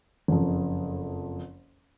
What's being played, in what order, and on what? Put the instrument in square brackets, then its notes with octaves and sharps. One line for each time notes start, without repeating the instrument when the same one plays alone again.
[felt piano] F#1 F2